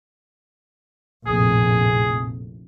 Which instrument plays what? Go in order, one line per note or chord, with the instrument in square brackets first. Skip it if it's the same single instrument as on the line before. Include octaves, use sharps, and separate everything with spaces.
[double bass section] F1 A#1 A2 [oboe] G#4